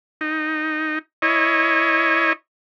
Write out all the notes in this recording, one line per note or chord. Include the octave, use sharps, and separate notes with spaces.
D#4
E4 C#5 D#5